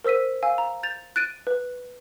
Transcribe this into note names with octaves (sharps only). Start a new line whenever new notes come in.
A#4 C5 E6 B6 D#7
F5 G#5 E6
A#5
G6 A6 F7
F#6 A6 D7 D#7
B4